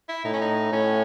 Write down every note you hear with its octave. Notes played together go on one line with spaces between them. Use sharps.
E4
A2 D#4
C#4
D#4
A2 C#4